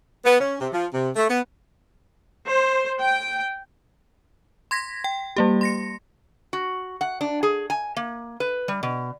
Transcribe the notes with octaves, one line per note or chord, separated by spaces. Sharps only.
B3
C#4
C3
F3
C3
A3
B3
C5
G5
C6 G#6 A#6 B6
G5
G3 A#3 G4
C6 A#6 C#7
F#4
F#5
D4
G#4
G#5
A#3
B4
G3
B2